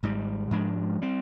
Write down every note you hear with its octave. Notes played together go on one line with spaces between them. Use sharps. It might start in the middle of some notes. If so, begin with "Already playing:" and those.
G#1 G#2 G3
G#2 F3 G#3 D4
G3 C4